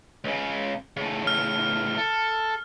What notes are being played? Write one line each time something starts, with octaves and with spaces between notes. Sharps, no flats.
C#2 C#3
A2 C#3
F6
A4